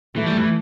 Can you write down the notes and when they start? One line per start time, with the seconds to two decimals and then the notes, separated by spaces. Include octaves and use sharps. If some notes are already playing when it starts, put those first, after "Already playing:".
0.15 E3 A3
0.26 G3
0.37 E3